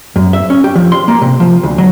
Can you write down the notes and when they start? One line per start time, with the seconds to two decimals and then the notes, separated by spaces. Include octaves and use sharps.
0.16 F#2
0.33 E5
0.50 C#4
0.64 G4
0.76 F3
0.92 C6
1.08 A#3
1.22 C3
1.40 F3
1.64 D2
1.78 F#3